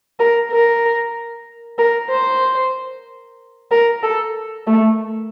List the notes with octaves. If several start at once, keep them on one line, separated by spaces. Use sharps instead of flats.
A#4
A#4
A#4
C5
A#4
A4
A3